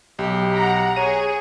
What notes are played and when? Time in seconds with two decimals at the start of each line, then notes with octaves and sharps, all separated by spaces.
0.19 B1 G4
0.54 F#5 A#5
0.96 G#4 C#5 D#7